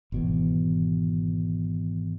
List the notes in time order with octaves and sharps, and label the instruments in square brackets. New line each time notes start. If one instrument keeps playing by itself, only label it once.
[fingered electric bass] G#1 B2 E3